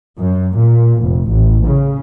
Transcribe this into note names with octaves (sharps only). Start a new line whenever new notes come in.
F#2
A#2
F1
A1
C#3